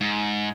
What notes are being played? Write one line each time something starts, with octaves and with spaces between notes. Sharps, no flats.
G#2